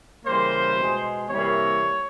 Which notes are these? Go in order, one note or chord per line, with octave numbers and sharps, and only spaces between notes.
C#3 E3 G3 A#3 C5
B2 G#3
C3 E3 G3 A#3 C#5